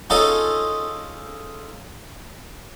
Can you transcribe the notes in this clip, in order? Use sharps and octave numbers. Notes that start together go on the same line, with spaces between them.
C#4 D#4 F4 G#4 A4 D#5